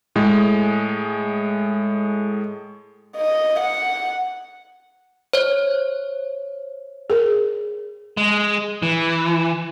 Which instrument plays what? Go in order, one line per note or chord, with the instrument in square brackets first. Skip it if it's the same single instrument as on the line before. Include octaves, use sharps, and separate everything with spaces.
[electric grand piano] A2 G#3
[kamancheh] D#5
F#5
[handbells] C5 C#5
[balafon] G#4 A#4
[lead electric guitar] G#3
E3